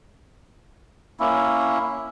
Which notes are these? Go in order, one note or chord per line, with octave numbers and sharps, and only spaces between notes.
A#3 C#4 E4